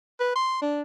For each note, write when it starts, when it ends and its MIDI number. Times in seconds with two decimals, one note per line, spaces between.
0.20 0.36 71
0.36 0.62 84
0.62 0.82 62